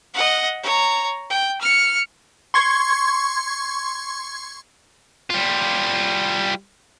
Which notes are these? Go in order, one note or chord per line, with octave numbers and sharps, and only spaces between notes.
D#5 F#5
C#5 A#5
G5
F6 C#7
C6 C#6 G#6
G3 F4